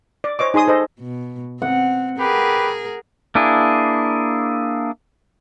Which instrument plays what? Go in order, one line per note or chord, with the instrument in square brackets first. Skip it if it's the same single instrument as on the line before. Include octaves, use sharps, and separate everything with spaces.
[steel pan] D5
C5 C#5 D#5 D6
D#4 G#4 C6 D#6
A4 C5 D#5
[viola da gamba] B2
[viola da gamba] C4 [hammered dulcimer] F#5
[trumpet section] G4 B4 [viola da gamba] G#4 A#4
[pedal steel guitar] A#3 D4 E4 G#4